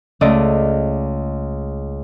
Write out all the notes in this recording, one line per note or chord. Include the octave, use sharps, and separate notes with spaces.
C#2 A3 D5 D#5 D6 D7